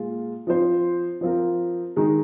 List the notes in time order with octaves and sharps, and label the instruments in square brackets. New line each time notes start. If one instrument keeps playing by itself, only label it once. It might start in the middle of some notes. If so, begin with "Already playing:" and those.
Already playing: [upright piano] A#2 G#3 F4
F3 C4 F4 C5
F3 C4 F4 A#4
D#3 G#3 D#4